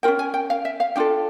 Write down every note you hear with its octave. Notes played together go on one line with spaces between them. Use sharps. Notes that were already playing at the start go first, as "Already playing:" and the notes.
C#4 F4 A#4 G5
G#5
G5
F5
E5
F5
D4 F4 A4 G5